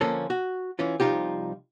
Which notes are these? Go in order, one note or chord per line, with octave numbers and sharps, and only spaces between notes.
D3 F3 A#3 C#4 A4
F#4
E3 C#4 F4
C2 F#2 F3 D#4 F4 G4